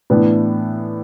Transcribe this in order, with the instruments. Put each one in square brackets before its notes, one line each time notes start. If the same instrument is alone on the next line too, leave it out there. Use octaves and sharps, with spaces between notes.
[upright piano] A2 E3 B3 D4